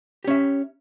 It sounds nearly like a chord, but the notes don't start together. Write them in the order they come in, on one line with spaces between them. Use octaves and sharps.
G4 C#4 E5